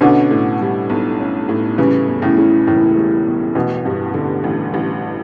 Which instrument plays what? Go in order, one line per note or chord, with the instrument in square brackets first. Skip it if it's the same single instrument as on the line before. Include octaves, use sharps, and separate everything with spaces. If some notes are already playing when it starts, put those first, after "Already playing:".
[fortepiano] B2 D3 [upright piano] C#4
[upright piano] A2
G3
B1
C#4
A2
[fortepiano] C#3 E3 [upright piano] G3
[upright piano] E2
[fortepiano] A2 C#3
[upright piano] C#3
[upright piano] E1 [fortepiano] A2
[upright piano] G3
E2
[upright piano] A1 [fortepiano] B2
[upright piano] G2
D3
A1
A1